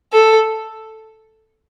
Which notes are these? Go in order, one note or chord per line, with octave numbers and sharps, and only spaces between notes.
A4